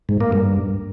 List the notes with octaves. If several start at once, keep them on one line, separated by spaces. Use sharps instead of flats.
G#2
A#3
G2